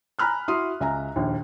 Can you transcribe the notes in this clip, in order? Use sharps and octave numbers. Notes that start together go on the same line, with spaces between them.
G#5 A#5 B5 F6 F#6
E4 F#4 C6 D#6
C#2 E5 G#5 A#5
A#1 D#2